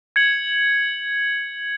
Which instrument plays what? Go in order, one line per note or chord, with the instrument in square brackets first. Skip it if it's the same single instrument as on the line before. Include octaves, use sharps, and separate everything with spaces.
[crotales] G#6 C#7 F#7